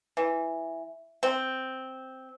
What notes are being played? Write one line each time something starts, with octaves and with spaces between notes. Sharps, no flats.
E3
C4